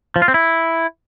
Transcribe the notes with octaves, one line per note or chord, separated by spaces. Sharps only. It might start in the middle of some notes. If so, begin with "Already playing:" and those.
F3
F4
C4
E4